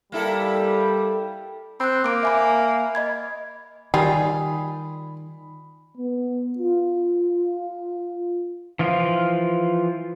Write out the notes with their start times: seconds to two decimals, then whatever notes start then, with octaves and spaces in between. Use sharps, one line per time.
0.12 G3 A#3 E4 A4
1.80 C4 B5 F#6
2.04 A#3 D6 D7
2.23 E5 G#5 B5
2.95 D#5 B5 G#6
3.94 D#3 G3 F4 G#4 B5
5.97 B3
6.58 F4
8.79 E3 F3 F4